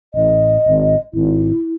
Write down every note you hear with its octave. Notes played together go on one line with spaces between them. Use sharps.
A1 D#5
G#1
G#1 E4